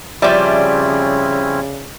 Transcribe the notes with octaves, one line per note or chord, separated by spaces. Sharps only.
C#3 F3 G3 C4 C#4 E4 D5 E5